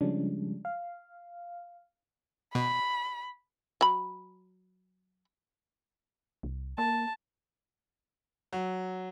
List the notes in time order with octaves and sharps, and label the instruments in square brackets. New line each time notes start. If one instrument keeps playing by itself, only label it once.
[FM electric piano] C#3 F3 G3 G#3 C#4 D4
F5
[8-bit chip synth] B2 [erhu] B5
[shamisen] F#3 B5
[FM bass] C2
[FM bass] A#3 [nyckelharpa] A5
[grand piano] F#3